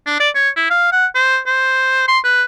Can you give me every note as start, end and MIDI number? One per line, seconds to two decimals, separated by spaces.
0.07 0.20 62
0.20 0.29 74
0.35 0.49 73
0.56 0.68 64
0.70 0.92 77
0.92 1.06 78
1.15 1.39 72
1.46 2.04 72
2.08 2.19 84
2.24 2.44 71